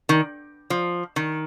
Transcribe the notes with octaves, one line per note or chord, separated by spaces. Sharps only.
D#3
F3
D#3